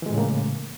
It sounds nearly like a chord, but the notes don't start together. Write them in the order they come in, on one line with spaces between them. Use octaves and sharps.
E3 G#3 A2 C#3 A#3